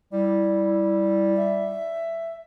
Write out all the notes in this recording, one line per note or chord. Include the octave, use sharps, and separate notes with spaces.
G3 E4
E5